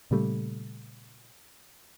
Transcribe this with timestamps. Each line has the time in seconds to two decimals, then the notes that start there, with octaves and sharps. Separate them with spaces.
0.11 A#2 C#3 G3 A3